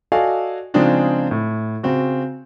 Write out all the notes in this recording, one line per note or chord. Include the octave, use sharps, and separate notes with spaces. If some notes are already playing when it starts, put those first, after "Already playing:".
F#4 A4 D5 D#5 F5 G#5
C#3 F3 G#3 C4 D4 D#4
A2
C#3 C4 F#4